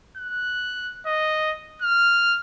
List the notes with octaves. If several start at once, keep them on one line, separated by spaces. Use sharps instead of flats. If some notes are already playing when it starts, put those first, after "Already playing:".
F#6
D#5
F6